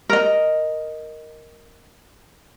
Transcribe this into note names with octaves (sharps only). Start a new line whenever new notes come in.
A#4 D#5